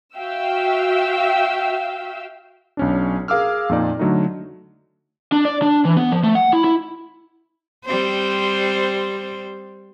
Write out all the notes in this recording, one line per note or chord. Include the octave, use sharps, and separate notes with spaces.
F#4 E5 F5 G5 E6
B1 C#4 D4
G#4 A#4 F5 D6 E6 F6
F2 A#2 D#4 D5
D3 F#3 A3 D#4
D4
D5
D4
E3
B3
F3
A3
F#5
E4
E4
G3 C4 C5